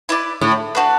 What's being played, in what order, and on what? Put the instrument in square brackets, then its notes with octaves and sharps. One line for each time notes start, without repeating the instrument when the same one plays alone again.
[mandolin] E4 B4 D5
[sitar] A2
[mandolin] D4 F#4 B4